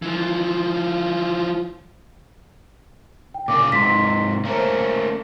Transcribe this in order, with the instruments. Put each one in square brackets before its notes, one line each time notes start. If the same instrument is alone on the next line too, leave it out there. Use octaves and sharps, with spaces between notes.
[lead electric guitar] E3 F3
[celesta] G5
[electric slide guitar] A#2 C#3 G#4 [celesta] D6
[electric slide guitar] G#2 C3 [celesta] C6 B6
[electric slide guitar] A3 A#3 C#4 [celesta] C5 A#5